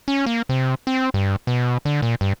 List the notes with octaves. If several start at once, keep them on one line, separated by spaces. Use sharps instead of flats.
C#4
A#3
C3
C4
G2
B2
D3
A#2
G2